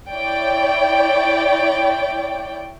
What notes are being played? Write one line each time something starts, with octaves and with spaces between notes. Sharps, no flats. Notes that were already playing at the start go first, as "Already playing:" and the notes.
E4 C#5 D5 G5